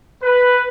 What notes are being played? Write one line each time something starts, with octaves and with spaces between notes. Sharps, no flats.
B4